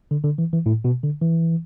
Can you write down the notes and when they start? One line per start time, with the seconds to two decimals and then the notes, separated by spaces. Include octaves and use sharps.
0.11 D3
0.24 D3
0.38 E3
0.53 E3
0.66 A2
0.85 B2
1.03 D3
1.22 E3